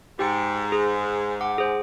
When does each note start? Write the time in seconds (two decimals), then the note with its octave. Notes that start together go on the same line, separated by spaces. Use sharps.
0.19 G#2 G4 G5 C#7
0.72 G#4
1.41 F#5 D6
1.58 G#4 C5